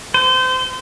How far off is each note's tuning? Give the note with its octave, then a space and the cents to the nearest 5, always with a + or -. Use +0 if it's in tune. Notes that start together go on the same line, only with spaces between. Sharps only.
C5 -30